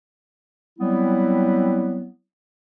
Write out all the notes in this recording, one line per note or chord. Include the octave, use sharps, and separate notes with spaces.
F#3 G3 B3 C4 E4